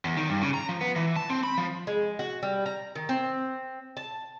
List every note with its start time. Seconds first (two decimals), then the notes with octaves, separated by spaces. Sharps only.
0.05 E2
0.17 D#3
0.29 G2
0.42 C#3
0.54 A#5
0.69 F3
0.81 B3
0.96 E3
1.16 A5
1.30 C4
1.43 B5
1.58 F3
1.87 G#3
2.19 F#4
2.42 G3
2.66 A#5
2.95 D#3
3.09 C4
3.97 A5